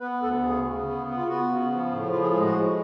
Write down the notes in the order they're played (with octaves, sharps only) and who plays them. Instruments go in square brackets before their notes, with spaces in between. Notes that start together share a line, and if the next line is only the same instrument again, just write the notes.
[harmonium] B3 B4
D2 A4
C#3 G#4
C#3
B3
B3
F4
B3 F#4
C#3
F3
A2
F3 F4
G#4
G#3 G#4
F#4
A2